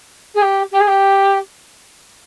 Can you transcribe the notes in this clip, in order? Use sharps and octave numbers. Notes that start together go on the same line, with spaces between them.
G#4
G4
G4
G#4
G4